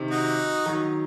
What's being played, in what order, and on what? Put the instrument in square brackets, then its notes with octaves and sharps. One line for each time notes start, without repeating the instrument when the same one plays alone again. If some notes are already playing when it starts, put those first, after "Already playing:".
Already playing: [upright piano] C3 D#3
[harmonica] D#4 F#4
[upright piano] D#3 F#3